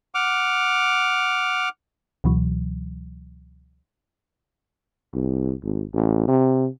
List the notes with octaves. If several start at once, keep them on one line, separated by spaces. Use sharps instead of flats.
F#5 D6 F6
C#2 B2 E3 F#3
C2
G#1
A1
C3